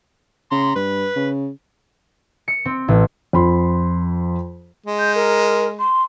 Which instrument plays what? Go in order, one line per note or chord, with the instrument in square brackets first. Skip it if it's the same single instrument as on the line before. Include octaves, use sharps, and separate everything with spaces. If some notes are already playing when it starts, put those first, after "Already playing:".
[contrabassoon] C#3 [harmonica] A#5 C6
[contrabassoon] G2 [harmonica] B4
[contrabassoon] C#3
[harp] C#7
C4
A1
[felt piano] F2 B5 C6
[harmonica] G#3
[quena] G6
A#4
C6